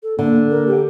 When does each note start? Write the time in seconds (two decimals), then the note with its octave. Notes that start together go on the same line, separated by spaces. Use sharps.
0.03 A4
0.19 D3 A#3
0.50 A#4
0.67 G4